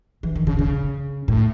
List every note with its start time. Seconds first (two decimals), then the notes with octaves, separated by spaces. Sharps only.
0.23 E3
0.36 D#3
0.47 C#3
0.59 C#3
1.28 A2